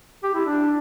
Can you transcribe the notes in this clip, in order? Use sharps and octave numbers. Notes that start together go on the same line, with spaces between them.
G4
E4
D4